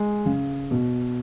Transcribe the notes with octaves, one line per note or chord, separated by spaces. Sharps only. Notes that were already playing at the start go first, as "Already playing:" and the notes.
Already playing: G#3
C#3
B2